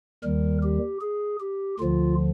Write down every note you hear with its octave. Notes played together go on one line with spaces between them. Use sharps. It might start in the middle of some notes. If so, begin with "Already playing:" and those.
D#2 D#3 G3 A#4
G4
G#4
G4
D2 D3 F3 F4